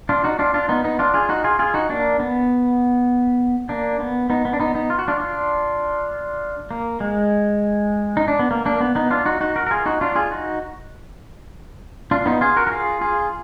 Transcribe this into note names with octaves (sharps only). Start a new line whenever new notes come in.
D4 F4
D#4 F#4
D4 F4
D4 F4
B3 D#4
B3 D#4
D4 F4
F4 G#4
D#4 F#4
F4 G#4
F4 G#4
D#4 F#4
A#3 D4
B3
A#3 D4
B3
B3 D#4
B3
D4
B3 D#4
B3 D#4
F4
F#4
D4 F4
D4 F4
A#3
G#3
D#4
D4
B3
A#3
A#3 D4
B3
B3 D#4
D4 F4
D#4 F#4
D#4 F#4
F#4 A#4
A#4
F4 G#4
D#4 F#4
D4 F4
F4 G#4
D#4 F#4
D4 F4
B3 D#4
F4 G#4
F#4 A#4
A#4
F4 G#4
F4 G#4